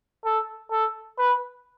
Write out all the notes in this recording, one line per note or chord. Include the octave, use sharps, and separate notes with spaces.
A4
A4
B4